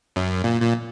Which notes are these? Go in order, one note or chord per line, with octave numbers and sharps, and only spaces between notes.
F#2
A#2
A#2